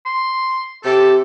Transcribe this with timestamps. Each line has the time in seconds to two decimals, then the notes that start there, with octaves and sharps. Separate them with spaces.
0.06 C6
0.85 C3 G4 A4